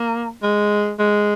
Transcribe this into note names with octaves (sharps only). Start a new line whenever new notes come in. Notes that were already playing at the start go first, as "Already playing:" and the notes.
Already playing: A#3
G#3
G#3